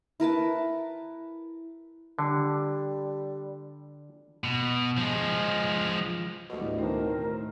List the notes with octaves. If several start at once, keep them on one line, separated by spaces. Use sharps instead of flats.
E4 A#4 B4 A5
D3 G3
B2
F3 G#3
D2 B2 G4 F#5
A2
D#3 C4 A#4 D#5 A5